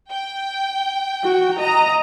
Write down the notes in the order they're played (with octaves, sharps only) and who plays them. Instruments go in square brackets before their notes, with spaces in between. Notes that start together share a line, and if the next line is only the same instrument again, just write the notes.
[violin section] G5
[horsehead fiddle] F#4
[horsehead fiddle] D#5 [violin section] A#5